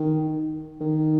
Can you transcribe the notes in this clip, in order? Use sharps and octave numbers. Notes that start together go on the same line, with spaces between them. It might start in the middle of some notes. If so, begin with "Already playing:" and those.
Already playing: D#3
D#3